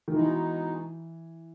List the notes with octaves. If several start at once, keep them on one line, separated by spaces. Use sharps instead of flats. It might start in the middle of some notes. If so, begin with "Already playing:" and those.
D#3
B2 E3 G#3 D#4